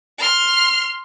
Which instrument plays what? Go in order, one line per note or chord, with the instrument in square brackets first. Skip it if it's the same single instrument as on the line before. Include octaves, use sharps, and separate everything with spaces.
[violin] C6 F6